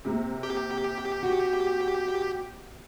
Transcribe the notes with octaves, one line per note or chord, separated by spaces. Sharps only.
C3 A#3
G4
F#4